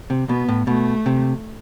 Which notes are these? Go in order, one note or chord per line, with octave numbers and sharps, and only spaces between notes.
C3
B2 B3
A2
B2 A3
C3